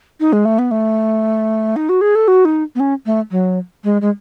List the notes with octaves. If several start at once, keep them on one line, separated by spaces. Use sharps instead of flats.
D#4
G#3
A3
B3
A3
D#4
F#4
G#4
A4
F#4
D#4
B3
C#4
A3
F#3
G#3
G#3